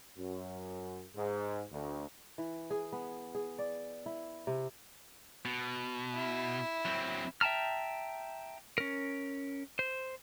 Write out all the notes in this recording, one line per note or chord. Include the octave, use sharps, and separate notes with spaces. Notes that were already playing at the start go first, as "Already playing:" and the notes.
F#2
G#2
D2
E3
G#4
B3
G#4
D5
E4
C3
B2
E4
F#3 C4
E5 G5 A5 A#5 F6
C#4 A#4
C5